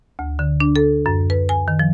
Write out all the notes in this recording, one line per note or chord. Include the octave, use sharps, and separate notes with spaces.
D2
D3
D4
A4
F#2
B4
G#5
D#3
F3